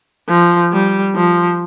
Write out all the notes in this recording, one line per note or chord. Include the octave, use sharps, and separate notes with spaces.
F3
G3
F3